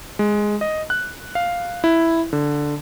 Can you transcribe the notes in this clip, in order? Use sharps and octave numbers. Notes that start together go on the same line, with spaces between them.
G#3
D#5
F#6
F5
E4
D3